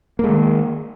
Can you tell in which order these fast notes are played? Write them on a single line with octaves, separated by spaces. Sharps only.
A#3 G#3 D#3